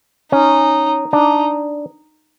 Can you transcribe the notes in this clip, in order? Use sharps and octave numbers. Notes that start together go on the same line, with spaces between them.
C#4 D#4
D4 D#4